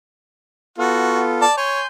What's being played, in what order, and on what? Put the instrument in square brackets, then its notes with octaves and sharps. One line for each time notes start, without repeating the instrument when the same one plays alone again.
[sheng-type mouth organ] B3 F4 A4 [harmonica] F#4
[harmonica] D5 A5
[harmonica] C#5 [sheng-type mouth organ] G#5 C6 G6